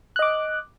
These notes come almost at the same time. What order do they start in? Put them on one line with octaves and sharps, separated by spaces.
F#6 D#5 D6